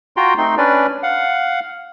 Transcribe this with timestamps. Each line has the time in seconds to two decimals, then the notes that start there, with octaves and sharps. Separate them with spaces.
0.17 F4 F#4 G5 A#5 C6
0.37 A3 C4 D#4 C6
0.57 C#4 D4 B4 D5
1.03 F5 F#5